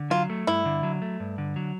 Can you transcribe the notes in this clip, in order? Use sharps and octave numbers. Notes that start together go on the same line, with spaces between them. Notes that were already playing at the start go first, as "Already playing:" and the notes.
Already playing: D3
F#3 F4
A3
G2 E4
D3
F#3
A3
G2
D3
F#3